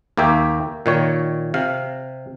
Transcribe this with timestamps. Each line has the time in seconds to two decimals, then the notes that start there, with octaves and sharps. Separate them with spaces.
0.17 D#2 A#3 G4 E5
0.86 A#2 D#3 C#5
1.54 C3 F5